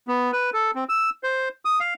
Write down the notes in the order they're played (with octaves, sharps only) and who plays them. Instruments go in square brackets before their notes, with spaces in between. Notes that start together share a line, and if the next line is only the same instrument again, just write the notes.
[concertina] B3
B4
A4
C4
E6
C5
D#6
F5